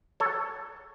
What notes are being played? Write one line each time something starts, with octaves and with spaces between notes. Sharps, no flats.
A4 C#5